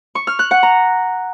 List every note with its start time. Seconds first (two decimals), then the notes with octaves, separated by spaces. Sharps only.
0.15 C#6
0.27 F6
0.39 F#6
0.51 F#5
0.63 A#5